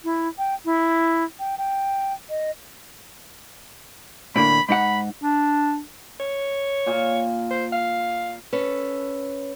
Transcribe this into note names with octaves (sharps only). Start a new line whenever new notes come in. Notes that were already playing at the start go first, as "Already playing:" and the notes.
E4
G5
E4
G5
G5
D#5
A2 D3 A#3 B5
G#2 D#4 F#5 B5
D4
C#5
A#2
C5
F5
C#4 A4 B4